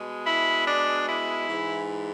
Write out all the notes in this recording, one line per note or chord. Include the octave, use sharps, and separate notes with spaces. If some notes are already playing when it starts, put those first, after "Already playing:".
Already playing: B2 G#3
E4
D4
E4
G#2 E3 G#3